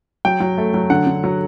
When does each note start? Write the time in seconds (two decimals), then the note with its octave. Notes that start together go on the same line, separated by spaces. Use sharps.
0.25 F#3 G5
0.40 F#3
0.58 A3
0.74 F#3
0.90 D3 F#5
1.07 D3
1.24 F#3